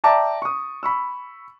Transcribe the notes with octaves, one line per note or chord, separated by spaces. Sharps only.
D5 E5 G5 A5 A#5 D6
C#6 D#6
B5 C#6 E6